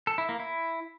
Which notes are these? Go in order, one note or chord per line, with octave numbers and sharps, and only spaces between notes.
A4
E4
A#3
E4